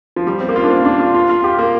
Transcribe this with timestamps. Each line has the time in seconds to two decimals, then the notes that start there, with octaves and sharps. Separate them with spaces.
0.16 F3
0.27 G3
0.41 C4
0.49 A#3
0.56 F4
0.64 D4
0.70 C4
0.85 D4
1.00 F4
1.14 F4
1.29 F4
1.44 G4
1.58 A#3